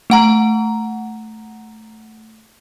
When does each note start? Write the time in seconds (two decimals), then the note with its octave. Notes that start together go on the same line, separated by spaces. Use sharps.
0.10 A3 F#5 A#5